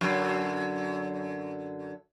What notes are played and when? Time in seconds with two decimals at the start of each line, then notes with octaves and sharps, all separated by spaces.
0.01 F#2 D3